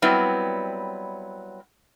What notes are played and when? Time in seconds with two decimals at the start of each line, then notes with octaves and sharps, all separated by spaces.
0.02 F#3 G3 B3 C4 E4